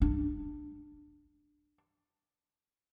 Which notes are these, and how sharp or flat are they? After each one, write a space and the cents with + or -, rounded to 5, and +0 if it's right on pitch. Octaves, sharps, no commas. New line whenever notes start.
D4 +15